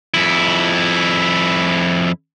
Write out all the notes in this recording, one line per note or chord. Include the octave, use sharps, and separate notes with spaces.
F2 E4